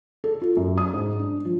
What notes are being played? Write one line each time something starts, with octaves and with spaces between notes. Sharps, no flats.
A4
F4
F#2
D#6
G#2
D4
F3